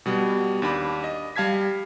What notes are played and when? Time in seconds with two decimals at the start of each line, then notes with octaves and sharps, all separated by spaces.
0.06 B2 G3 B3
0.62 D#2 D4 B5 D6
1.04 D#5
1.36 G3 F5 A5 G#6 B6